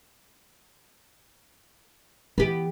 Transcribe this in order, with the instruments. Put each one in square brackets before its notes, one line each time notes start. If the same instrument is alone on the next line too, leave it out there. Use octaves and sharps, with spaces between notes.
[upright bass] E3 [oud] B3 G4